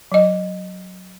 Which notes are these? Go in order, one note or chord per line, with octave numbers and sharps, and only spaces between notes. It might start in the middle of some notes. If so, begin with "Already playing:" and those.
F#3 D#5